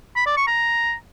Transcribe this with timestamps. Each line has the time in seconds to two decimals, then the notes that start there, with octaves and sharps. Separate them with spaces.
0.16 B5
0.26 D5
0.37 C#6
0.47 A#5